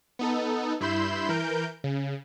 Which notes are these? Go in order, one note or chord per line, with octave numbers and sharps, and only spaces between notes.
B3 D#4 A4
G2 E4 B5 C6 G6 E7
E3 A#4 G6 D7
C#3